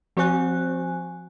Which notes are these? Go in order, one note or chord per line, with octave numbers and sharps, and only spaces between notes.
F3 C4 F#4 C5 G#5 F#6